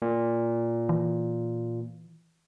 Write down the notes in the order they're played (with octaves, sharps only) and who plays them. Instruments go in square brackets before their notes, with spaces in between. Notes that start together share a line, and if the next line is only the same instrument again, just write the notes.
[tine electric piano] A#2
[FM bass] E3